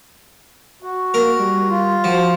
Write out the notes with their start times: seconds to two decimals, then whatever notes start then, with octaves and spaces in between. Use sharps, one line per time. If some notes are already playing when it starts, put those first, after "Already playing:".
0.82 F#4
1.14 A#3 A#4
1.39 G3
1.69 F4
2.04 F3 F#4